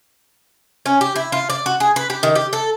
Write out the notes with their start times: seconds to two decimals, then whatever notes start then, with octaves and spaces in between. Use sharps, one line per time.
0.86 C#4
1.01 G4
1.16 E4
1.32 F4
1.50 D5
1.66 F#4
1.80 G#4
1.96 B4
2.10 G4
2.23 D#3
2.35 G4
2.53 A4